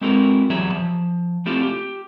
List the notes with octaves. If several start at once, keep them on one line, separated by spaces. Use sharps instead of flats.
G#3 C4 E4 F#4 A4 A#4
E2 F#3 G3 G#4 E5 A#5
F3
A3 C4 E4 F4 G4 A4
G4